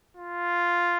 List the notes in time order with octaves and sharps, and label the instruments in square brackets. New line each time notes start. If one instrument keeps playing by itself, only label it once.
[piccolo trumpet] F4